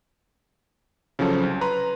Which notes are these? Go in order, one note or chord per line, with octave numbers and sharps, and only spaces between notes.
C#3 F3 F#3 C#4 A4
C2
B4 A#5 C6